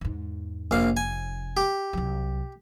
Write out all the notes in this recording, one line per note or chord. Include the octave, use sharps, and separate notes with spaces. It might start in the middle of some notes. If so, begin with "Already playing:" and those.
E2 G#2
F1 A#1 F5
G#5
G4
C2 F#3